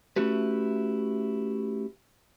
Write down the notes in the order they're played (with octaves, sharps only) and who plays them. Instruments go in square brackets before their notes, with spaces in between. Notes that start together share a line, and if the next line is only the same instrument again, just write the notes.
[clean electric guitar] A3 C#4 E4 F#4 G4 B4